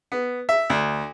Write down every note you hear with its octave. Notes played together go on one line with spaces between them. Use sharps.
B3
E5
D2